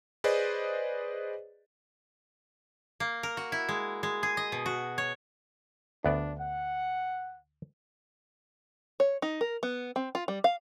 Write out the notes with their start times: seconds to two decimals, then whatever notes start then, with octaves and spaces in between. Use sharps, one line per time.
0.24 G#4 B4 C5 D5 D#5
3.00 A#3
3.23 A#4
3.37 F#4
3.52 E4
3.69 G#3
4.03 G#3
4.23 G#4
4.37 D#5
4.52 B2
4.66 F#4
4.98 C#5
6.05 D2 B3 D4 D5
6.39 F#5
9.00 C#5
9.22 D#4
9.41 A#4
9.63 B3
9.96 C4
10.15 F4
10.28 G3
10.44 F5